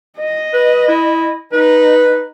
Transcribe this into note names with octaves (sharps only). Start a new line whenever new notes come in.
D#5
B4
E4
D#4 B4